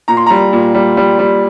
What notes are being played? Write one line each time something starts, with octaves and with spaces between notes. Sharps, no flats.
A#2 A#5
C6
G3 A#5
A#2
G3
G3
G3